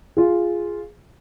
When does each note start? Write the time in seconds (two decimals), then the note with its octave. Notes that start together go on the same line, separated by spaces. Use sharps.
0.17 F4 G#4